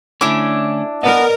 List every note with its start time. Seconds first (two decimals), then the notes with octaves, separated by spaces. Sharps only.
0.21 D3 A3 C#4 D4 E4 D6
1.03 B3 A#4 B4 D5 D#5